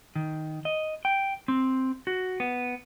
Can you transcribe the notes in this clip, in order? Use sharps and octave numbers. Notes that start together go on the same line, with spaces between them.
D#3
D#5
G5
C4
F#4
B3